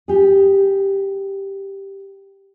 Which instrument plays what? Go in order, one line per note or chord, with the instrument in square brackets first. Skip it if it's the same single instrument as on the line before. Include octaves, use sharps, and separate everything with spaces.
[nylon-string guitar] G4 G#4